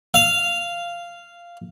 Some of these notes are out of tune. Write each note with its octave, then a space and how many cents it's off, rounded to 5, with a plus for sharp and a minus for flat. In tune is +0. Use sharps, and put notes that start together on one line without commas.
F5 -10